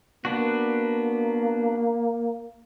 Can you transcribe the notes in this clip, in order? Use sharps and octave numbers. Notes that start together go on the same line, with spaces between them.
A#3 B3 D4 F#4